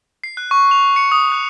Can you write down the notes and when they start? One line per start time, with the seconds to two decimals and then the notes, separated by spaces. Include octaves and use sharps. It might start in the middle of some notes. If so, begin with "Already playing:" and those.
0.24 C7
0.37 F#6
0.51 C#6
0.71 F7
0.96 C#7
1.12 D#6
1.32 F#6